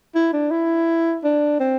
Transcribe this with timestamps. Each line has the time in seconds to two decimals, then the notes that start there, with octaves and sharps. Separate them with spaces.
0.15 E4
0.33 D4
0.51 E4
1.24 D4
1.60 C4